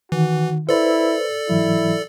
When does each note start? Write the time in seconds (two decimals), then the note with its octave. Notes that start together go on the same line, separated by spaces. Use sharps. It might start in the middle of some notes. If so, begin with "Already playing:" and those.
0.12 D#3 E3 F#4
0.69 E4 A4 B4 C5 D5
1.49 G#2 E3 F#3 E4